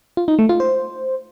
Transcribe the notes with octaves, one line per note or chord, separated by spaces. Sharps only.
F4
D#4
A3
F4
C5